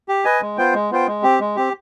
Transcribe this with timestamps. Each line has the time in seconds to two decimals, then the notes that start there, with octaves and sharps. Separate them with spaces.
0.09 G4
0.25 B4 D#5 G#5
0.41 G#3
0.57 B3 F4 C5 G5
0.74 G#3
0.91 B3 F4 C5 G5
1.08 G#3
1.23 C4 G4
1.40 G#3
1.56 C4 G4